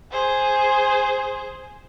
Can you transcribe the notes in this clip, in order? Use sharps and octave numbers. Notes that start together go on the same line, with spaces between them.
G#4 C5